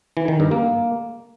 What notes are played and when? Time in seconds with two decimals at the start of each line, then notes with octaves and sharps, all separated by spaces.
0.17 E3
0.28 D#3
0.40 G2
0.51 A#3